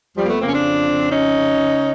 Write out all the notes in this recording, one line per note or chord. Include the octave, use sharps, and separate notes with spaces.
F2 F3 G3
A#3
A3 B3
C#3 A#3 C4
C#4
C4 D4
F2
C#3
F2 C#4 D#4
C#3
C#3